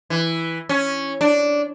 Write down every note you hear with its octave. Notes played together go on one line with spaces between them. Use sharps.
E3
C#4
D4